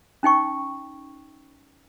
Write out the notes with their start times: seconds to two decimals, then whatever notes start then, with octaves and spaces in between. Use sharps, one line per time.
0.23 C#4 D#4 G5 C#6